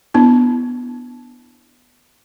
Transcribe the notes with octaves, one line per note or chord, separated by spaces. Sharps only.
B3 D4 E4